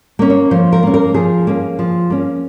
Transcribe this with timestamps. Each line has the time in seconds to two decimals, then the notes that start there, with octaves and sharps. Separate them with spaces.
0.19 A#3 C#4
0.30 C#5
0.51 F3 C5
0.72 A#4
0.83 A#3 C#4
0.94 A#4
1.14 F3 G#4
1.47 A#3 C#4
1.79 F3
2.10 A#3 C#4